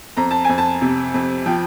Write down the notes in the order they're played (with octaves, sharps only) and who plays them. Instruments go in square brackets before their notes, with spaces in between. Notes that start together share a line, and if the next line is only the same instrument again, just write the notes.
[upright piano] F2 A#5
A5
F2 G#5
A5
C3
F2
F3 G5